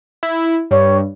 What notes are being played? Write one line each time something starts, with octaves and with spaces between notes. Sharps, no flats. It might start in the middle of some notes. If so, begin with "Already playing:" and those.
E4
G2 C#5